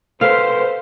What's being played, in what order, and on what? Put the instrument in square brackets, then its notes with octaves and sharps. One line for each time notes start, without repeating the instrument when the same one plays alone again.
[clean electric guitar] C3 A4 B4 [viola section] C5 [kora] F5